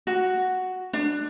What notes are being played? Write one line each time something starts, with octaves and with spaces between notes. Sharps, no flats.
F#4
D4